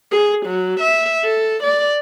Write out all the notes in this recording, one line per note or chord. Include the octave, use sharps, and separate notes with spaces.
G#4
F#3
E5
A4
D5